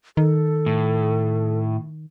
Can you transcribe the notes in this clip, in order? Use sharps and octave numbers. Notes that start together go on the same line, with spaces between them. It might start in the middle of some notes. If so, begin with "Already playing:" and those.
D#3 A4
A2